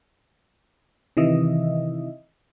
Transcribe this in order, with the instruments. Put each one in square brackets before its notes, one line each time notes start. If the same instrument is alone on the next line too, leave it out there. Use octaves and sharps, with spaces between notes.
[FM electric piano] C3 D#3 E3 D#5 E5